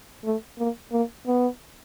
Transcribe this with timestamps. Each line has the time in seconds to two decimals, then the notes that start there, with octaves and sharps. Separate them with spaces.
0.24 A3
0.59 A#3
0.92 A#3
1.27 B3